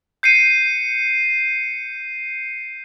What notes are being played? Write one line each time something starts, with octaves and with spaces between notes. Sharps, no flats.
G6 C7 C#7 D#7